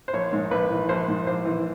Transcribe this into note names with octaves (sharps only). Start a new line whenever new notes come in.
C5
A#1 C#5
G#2
A#1 B4
E3
A#1 C5
G#2
A#1 C5
E3